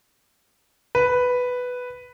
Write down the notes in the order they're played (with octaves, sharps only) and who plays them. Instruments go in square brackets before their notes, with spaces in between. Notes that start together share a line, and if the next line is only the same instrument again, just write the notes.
[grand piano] B4